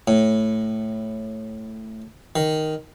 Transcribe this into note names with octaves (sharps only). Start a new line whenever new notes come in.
A2
D#3